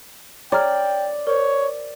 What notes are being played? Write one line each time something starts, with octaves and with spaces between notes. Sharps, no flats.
C#5 D5 G5 A#5 F6
A#4 C5 C#5